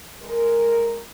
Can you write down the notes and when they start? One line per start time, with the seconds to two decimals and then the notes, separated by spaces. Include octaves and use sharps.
0.22 G#3 A#4